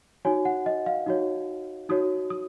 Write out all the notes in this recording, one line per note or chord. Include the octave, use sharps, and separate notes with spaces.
D#4 F#4 C#5 G#5
F#5
D#5
F5
D#4 F#4 C#5
D#4 F#4 C#5 D#6
D#6